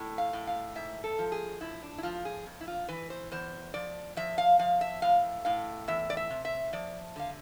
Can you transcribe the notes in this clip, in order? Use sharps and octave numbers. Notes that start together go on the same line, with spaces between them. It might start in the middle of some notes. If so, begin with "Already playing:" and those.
Already playing: A2
F5
A2
F5
G#2 E5
A4
F3
G#4
A2 E4
D4
E4
F3 F4
G#4
F2
E4
F4
E3 B4
C5
E2 C5
F3 D5
F3 E5
F5
F3 F5
E5
A2 F5
A2 F5
E2 E5
D5
E5
C3
E5
F3 D5
D3 F5